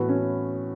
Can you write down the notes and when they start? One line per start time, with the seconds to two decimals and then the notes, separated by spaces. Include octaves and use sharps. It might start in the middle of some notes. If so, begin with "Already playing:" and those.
Already playing: A2 E3 B3 F#4
0.09 C#4